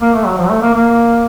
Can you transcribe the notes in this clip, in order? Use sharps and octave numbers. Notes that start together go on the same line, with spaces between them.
A#3
A3
F#3
F3
F#3
A3
A#3
A#3